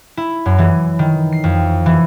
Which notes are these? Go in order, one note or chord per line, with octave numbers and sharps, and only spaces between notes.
E4
F#2
E3
D#3
C7
F2
E3